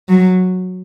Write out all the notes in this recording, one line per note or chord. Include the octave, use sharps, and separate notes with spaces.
F#3